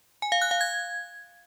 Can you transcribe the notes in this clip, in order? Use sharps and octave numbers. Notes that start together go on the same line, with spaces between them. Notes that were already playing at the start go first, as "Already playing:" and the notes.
G#5
F5
F#6
F5
G#6